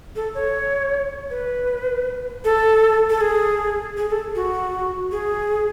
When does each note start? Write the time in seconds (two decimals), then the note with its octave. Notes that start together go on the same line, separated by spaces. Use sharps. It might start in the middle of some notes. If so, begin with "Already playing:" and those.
0.16 A4
0.35 C#5
1.30 B4
2.45 A4
3.10 A4
3.21 G#4
3.97 G#4
4.10 A4
4.35 F#4
5.12 G#4